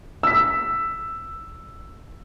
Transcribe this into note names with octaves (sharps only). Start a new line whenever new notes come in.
E6 B6